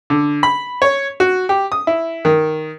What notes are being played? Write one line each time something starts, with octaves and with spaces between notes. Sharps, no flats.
D3
B5
C#5
F#4
G4
D#6
E4
D#3